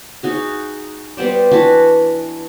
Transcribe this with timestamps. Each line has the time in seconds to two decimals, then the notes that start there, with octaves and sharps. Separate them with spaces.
0.23 D#4 F#4 G#4
1.17 G3 B3 C5 D5
1.51 E3 D4 F#4 B4